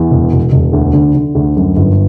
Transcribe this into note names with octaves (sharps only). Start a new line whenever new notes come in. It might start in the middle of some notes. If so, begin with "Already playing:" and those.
Already playing: E2
E1
E1
E1
D2
D3
D3
D2
F#2
G1